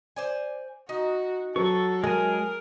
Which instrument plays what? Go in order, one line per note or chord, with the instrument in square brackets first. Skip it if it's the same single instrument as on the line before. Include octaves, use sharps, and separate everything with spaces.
[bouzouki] C5 D5 G#5
[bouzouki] D#4 [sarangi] F#4
[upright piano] F#3 [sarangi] A4 [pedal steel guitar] C#6
[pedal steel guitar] G#3 G#5 [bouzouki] G#4 [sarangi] A#4